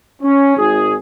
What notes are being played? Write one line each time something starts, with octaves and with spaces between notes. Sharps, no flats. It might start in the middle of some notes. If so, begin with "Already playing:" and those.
C#4
G#1 G#4